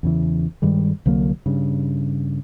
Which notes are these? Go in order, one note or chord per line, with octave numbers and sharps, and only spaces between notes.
E2 C#3 E3
G2 D#3 G3 G#3
C2 D3 F#3 A#3
G2 C#3